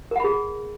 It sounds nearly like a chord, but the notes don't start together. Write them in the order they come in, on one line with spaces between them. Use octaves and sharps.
A#4 F#5 B5 G#4